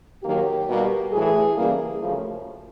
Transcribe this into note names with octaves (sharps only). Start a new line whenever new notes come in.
D#2 D#3 F#3 A#3 G4
B2 G3 A#3
A2 E3 A3 G#4
F#2 C#3 E3 G3 A#3
F#2 C#3 F3 A3